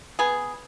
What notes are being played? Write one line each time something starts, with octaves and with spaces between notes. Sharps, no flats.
B3 G#4